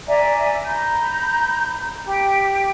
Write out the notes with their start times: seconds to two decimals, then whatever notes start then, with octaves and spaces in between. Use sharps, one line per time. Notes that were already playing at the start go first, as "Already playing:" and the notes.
0.07 D5 E5 G#5 A#5
0.64 A#5 B5 G6
2.04 G4